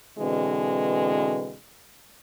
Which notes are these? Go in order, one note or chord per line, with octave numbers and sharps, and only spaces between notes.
B2 D3 E3 G#3 B3 C4